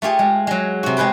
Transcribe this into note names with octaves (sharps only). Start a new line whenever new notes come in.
A3 F4 G4 G#4
G#3
F#3 G#3
C3 F#4
G#3 C4 G#4 B4 G5